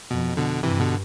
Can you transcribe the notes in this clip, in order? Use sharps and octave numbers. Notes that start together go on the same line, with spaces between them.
F2 B2
B2 D3
G2 C3 E3
B2 D3